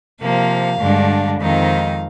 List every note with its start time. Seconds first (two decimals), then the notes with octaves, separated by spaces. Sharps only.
0.21 C3 F3 A#3 F5
0.81 G2 D3 G#3 D4
1.41 F2 D#3 G#3 C4 D#4 F5